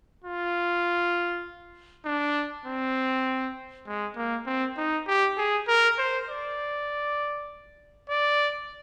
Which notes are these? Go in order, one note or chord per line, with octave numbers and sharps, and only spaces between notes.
F4
D4
C4
G#3
A#3
C4
D#4
G4
G#4
A#4
C5
D5
D5